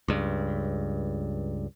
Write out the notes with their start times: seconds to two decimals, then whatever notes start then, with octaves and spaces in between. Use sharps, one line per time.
0.08 C#2 G2